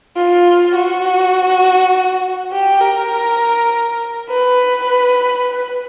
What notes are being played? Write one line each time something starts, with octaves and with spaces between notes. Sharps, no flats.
F4
F#4
G4
A#4
B4